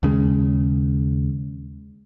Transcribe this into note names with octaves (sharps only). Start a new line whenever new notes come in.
D#2 C#3 G#3